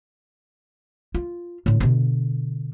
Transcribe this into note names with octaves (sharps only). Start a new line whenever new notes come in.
F4
A2 D3
B2 D3